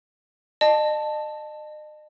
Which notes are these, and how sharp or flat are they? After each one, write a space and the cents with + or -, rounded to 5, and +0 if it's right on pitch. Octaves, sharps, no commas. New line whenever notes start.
D#5 -40 A5 +0